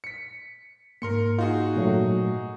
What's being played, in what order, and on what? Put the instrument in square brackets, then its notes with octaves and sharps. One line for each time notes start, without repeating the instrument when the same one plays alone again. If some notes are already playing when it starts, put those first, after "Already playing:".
[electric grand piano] B6 C#7
[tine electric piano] G#2 A#3 [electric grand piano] A#4 C6 C#7
[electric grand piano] D#4 F#4 G#4 [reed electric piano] F4
[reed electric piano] A#2 F#3 A3